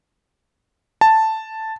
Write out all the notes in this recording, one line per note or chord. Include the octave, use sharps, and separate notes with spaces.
A5